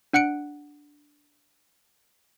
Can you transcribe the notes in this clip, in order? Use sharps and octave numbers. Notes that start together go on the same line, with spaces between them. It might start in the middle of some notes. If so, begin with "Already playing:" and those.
D4 F#5 F#6 C#7 D7